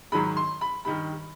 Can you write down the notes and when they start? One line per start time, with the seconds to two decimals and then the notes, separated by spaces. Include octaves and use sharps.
0.12 G#2 D#3 F#3 B5
0.37 C6
0.61 B5
0.85 G2 D#3 G3 B5